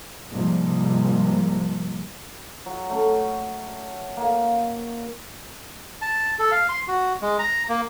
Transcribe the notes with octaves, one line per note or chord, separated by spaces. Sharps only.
G#2 C3 F3 G3 A#3
F#3
A3 C#4
A#3 F5
A5
A4
F5
C6
F#4
G#3
A#5
A#3